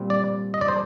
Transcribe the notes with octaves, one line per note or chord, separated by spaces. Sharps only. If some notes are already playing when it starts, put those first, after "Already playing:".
Already playing: A#2 G3 C4
D5
D#5
D5
C5